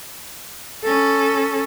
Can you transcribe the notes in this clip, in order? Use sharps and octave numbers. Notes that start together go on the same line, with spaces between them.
C#4 A4